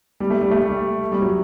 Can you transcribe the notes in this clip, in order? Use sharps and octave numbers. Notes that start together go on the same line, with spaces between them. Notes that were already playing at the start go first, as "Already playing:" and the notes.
G3
A3
G3
A3
G3
G3
F#3